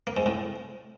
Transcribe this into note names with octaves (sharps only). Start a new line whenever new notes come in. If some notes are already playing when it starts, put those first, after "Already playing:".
A#3
G#2
A2